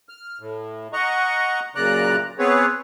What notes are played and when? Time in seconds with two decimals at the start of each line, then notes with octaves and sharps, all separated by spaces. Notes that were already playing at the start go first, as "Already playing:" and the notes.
0.09 F6
0.40 A2
0.93 D#5 F#5 A#5 C#6
1.75 F#2 A#2 C#3 D5 A#5 F#6
2.39 B3 C4 G#4 B4 C#5